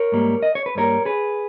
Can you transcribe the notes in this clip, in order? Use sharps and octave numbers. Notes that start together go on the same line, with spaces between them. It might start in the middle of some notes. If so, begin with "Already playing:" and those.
Already playing: A#4 C#5
G#2 G3 A#3
D#5
C#5
B4
G2 G3 A#3 A#4 C#5
G#4 B4